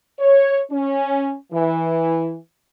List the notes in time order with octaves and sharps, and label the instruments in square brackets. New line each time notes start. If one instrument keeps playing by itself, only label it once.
[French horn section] C#5
C#4
E3